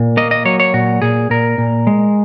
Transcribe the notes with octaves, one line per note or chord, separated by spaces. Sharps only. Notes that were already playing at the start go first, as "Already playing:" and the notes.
Already playing: A#2
A#3 D#5
D#5
F#3 C#5
C#5
A#2 F#4
A#2 G#4
A#2 A#4
A#2
G#3